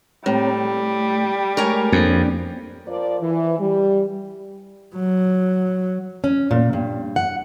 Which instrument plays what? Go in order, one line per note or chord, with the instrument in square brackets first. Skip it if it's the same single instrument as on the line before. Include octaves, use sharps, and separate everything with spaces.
[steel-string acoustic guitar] A2 [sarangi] G3 [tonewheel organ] C4 C#5 A#5
[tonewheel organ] A3
[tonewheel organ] G#3 A3 [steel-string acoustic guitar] A#4 C#5 G#5
[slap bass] F2 [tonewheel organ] A#3 C4 D4
[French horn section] F3 A#4 D5
E3
G3
[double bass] F#3
[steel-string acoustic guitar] C#4
A#2
G2
F#5